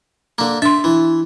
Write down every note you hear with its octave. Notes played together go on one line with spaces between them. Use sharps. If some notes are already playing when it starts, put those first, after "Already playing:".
D3 A#3
D4 E5 C6
E3